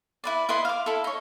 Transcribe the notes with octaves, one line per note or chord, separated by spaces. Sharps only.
E4 B4 D5
E4 B4 D#5 C6
F5 D6
E4 A4
D#4 C#5